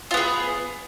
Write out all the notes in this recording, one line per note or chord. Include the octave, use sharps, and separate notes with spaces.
B3 F4 G#4